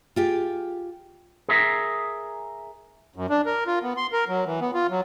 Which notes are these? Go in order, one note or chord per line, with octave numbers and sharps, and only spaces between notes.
F4 G4 G#4
G#4 A#4 E5
F#2
D4
A#4
F4
B3
C6
A#4
F#3
E3
B3
F4
F#3